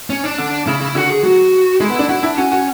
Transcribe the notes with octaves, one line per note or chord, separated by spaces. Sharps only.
C#4
D4
D3
C#3 E4
C#3
D3 F#4
G#4
F#3 F#4
G#3 E4
B3
D4
E4 F#4
D4 E4
C#4 F#4
F#4